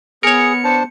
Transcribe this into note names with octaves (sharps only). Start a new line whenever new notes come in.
B3 G#4 A#4 C#5 C#7
D4 C5 A5